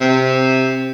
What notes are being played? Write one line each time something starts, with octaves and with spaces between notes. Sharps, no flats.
C3